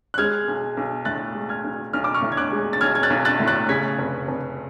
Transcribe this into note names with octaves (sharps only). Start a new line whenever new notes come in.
F#6
G#3 F6 G#6
B1
B1
A2 F#6 A6
G#3
F6 G#6
B1
B1 F6
D6
C#6 F6
A2
G#6
D6 F#6
G#3
A6
B1 F6 G#6
G#6
F#6 A6
B1
F#6 A6
A2
F#6 A6
C#3 G#6 B6
F1
F1